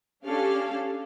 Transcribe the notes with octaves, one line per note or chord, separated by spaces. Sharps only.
C#4 D4 G4 A4 F5